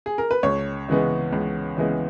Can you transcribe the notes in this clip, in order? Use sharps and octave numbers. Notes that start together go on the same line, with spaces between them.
G#4
A#4
B4
C#2 C#5
C#3 E3 G#3 B3
C#2
C#3 E3 G#3 B3